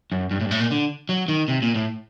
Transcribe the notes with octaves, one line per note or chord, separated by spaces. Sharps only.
F#2
G2
A2
G2
A2
A#2
D3
F#3
D#3
C3
A#2
A2